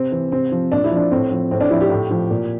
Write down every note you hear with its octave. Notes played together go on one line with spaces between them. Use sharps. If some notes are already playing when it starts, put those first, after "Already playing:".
Already playing: C3 C4
E3
C3 C4
F3
A#2 D4
E4
F3 D4
A2 C4
F3
A2 C4
D4
F3 E4
G4
A2
F3
A#2